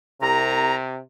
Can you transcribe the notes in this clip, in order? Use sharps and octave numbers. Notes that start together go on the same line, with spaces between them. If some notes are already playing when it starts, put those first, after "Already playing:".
C2 C3 A#5